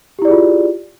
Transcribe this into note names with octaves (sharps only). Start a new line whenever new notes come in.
E4 F4 G4 G#4 D5